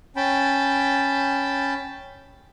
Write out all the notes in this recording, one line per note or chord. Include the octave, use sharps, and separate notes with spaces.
C#4 G5 A5 B5